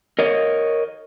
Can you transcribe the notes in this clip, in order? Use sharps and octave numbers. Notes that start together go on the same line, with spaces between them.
A#4 C#5 D#5